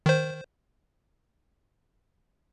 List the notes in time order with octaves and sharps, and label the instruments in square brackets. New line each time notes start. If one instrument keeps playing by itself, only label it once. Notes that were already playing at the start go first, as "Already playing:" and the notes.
[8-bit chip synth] D#3 C5